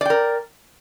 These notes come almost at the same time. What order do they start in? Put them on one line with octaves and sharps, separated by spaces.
D5 G5 A#4